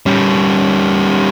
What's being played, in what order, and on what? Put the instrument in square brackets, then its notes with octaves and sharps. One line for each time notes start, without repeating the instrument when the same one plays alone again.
[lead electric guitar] G3 C#4